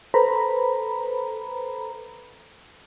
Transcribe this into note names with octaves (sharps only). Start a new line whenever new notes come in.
A4 B4 C5 A#5 B5